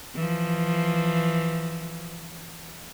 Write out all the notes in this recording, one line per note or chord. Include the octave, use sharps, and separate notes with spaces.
E3 F3